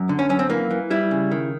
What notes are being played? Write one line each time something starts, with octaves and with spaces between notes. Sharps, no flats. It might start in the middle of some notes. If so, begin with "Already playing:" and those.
Already playing: F#2
D3
C#4
F#2 C#4
C4
E3 A#3
E3
G3 E4
C#3
D#3